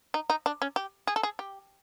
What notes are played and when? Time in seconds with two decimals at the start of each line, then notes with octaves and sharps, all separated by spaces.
0.14 D#4
0.30 D#4
0.46 D4
0.62 C#4
0.76 G4
1.07 G#4
1.16 A4
1.23 G#4
1.39 G4